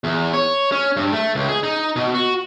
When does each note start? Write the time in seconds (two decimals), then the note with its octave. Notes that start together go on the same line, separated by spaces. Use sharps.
0.04 E2
0.33 C#5
0.72 C#4
0.97 G2
1.12 A3
1.35 C#2
1.49 G#4
1.63 D#4
1.96 B2
2.14 F#4